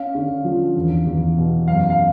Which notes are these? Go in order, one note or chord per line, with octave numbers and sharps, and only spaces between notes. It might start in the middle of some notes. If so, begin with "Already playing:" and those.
Already playing: C#4 F5
D3
F3
E2
E2
B2
F#2 F5
F5